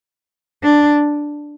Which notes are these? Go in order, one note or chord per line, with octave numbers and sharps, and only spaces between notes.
D4